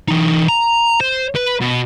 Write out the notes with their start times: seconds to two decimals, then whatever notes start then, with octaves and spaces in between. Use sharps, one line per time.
0.08 E3 D#4
0.49 A#5
1.01 C5
1.36 B4
1.61 B2